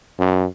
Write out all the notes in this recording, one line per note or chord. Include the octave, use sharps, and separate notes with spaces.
F#2